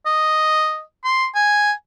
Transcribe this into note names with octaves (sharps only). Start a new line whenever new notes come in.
D#5
C6
G#5